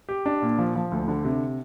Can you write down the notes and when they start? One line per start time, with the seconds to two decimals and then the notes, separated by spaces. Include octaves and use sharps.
0.09 G4
0.26 D4
0.42 A#2
0.58 F3
0.76 F3
0.92 D2
1.08 D3
1.25 C3